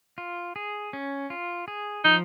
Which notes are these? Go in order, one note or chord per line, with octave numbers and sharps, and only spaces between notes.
F4
G#4
C#4
F4
G#4
F3 D#4